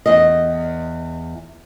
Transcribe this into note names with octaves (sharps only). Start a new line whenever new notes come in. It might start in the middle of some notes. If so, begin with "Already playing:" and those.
E2 D#5